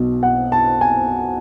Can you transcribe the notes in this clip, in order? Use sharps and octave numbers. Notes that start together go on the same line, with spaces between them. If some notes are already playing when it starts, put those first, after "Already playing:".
Already playing: B1 B2
F#5
A5
G#5